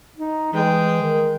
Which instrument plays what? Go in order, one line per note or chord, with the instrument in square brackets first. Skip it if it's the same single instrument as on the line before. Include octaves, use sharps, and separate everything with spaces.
[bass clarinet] D#4
[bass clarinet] E3 [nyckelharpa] G#3 G5
[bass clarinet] D#3